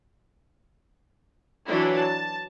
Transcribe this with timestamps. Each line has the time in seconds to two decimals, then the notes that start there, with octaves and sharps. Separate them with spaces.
1.67 E3 F#3 D4 E4
1.97 A5